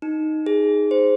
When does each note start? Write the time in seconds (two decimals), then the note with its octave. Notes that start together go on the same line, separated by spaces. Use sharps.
0.02 D#4
0.46 G#4
0.91 C5